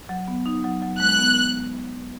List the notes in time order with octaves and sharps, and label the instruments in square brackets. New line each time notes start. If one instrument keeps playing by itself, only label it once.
[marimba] F#3
B3
D#4
F#3
F#3
[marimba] G#3 [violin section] F#6
[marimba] B3